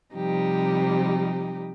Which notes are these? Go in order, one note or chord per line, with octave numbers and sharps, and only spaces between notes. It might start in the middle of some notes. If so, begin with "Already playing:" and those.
C3 F3 G3 D#4 G4